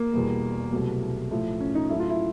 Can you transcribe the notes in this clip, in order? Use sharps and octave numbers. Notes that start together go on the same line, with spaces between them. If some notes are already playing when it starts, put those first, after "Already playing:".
Already playing: A#3
E2 B2 G3
C2 B2 F#3 A3
A2 F3 A3
C#4
D#4
A2 F#3 A3 E4
F4
E4